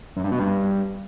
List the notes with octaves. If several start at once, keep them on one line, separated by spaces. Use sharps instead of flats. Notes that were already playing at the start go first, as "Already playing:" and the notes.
F#2
G2
B2
G2